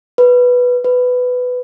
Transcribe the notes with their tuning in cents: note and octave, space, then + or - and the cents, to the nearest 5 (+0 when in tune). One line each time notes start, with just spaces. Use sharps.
B4 -5
B4 +10